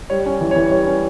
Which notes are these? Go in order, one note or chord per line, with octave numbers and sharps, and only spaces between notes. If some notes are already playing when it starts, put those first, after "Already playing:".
G3 C#5
C#4
E3
C#5
E3
G3 C#5
C#4